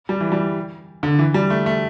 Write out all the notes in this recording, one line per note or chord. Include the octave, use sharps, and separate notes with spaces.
G3
E3
G3
D3
E3
G3
A3
A3